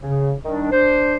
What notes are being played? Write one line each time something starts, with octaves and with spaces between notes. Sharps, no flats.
C#3
D#3 G3 D4
D4 C5